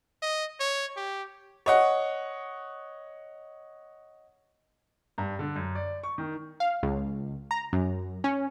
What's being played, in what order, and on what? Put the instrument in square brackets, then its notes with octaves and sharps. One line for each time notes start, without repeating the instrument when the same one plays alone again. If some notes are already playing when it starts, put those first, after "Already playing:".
[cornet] D#5
C#5
G4
[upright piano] C#5 D#5 F#5
[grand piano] G2
D3
F#2
D5
C#6
D#3
[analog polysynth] F5
C#2
A#5
F#2
C#4